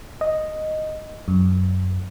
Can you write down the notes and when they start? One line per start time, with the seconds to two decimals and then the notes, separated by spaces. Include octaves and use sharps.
0.21 D#5
1.28 F#2